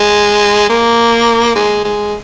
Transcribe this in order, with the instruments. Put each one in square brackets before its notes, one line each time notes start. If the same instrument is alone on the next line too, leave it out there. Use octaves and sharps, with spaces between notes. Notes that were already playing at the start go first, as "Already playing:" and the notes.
Already playing: [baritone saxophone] G#3
A#3
G#3
G#3